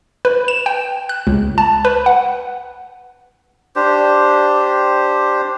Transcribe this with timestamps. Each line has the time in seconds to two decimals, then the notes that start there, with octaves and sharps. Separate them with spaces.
0.25 B4
0.48 E7
0.66 G5
1.09 F#6
1.27 C#2
1.58 A5
1.85 B4
2.06 F#5
3.76 D4 G4 C5